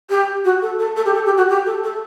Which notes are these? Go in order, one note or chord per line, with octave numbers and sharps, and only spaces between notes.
G4
F#4
A4
A4
A4
G4
A4
G4
F#4
G4
A4
A4